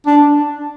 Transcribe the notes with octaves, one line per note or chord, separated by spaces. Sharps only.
D4